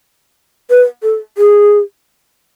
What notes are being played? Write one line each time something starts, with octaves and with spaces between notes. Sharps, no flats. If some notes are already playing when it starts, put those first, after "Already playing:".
B4
A4
G#4